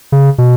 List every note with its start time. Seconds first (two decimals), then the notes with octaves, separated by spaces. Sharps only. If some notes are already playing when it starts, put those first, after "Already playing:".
0.12 C#3
0.38 B2